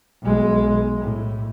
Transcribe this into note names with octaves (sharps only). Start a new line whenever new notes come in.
B1 G#3
A2